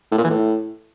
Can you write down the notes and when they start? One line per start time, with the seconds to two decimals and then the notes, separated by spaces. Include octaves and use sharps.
0.12 A2
0.18 A#2
0.24 E3
0.31 A2